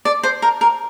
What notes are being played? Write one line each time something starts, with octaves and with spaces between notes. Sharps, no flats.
D5
C5
A#4
A#4